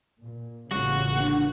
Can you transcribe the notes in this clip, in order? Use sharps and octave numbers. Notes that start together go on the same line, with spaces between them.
A#2
A1 C#3 G3 A#3 F4 F#4
D3 A#3